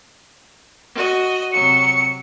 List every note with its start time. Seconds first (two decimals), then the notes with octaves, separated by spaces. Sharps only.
0.94 F#4 D#5
1.53 C3 F#3 C#7